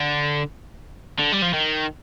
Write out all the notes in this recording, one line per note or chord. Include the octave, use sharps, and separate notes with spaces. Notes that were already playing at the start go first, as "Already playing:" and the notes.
Already playing: D3
D3
G3
F3
D#3